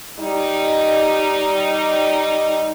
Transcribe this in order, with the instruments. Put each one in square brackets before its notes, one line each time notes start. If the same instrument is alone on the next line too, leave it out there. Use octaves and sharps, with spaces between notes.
[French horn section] G3 D#4